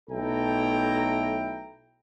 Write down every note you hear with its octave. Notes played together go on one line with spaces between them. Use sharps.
B1 A3 E4 A4 G5 A#5